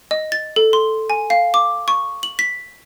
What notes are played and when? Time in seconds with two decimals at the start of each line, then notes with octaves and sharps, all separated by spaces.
0.11 D#5
0.32 A6
0.56 A4
0.73 C6
1.10 G#5
1.30 F5
1.54 D6
1.88 C#6
2.23 F#7
2.39 B6